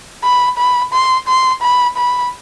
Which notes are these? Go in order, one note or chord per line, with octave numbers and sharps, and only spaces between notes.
B5
B5
C6
C6
B5
B5